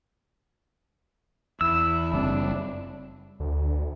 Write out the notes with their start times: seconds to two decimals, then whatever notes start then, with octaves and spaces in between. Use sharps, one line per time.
1.61 E2 E4 E6
2.13 F#1 G3 C4 D4
3.40 D2